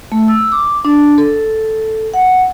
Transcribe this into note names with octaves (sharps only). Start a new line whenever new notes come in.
A3
E6
D6
D4
A4
F#5